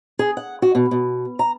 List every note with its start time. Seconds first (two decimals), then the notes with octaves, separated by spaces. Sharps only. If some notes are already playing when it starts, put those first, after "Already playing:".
0.19 G#4
0.37 F#5
0.62 F#4
0.75 B2
0.91 B2
1.39 A#5